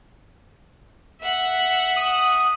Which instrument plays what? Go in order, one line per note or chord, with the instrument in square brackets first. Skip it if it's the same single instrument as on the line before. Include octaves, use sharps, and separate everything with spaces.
[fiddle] E5 F#5
[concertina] D#6